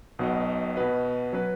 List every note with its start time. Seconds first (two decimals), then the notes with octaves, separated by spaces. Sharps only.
0.19 B1 B2 B3 F#4 D#5
0.76 B2 B3 F#4 B4 D#5
1.33 F#3 C#4 B4